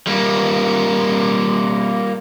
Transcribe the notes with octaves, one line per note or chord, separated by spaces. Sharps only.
G3 A#3